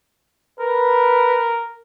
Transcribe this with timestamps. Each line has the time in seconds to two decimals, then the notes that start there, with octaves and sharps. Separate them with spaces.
0.60 A#4 B4